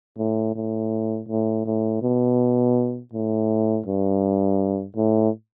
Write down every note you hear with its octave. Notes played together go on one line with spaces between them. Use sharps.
A2
A2
A2
A2
B2
A2
G2
A2